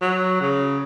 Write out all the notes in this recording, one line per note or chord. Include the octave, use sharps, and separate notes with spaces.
F#3
C#3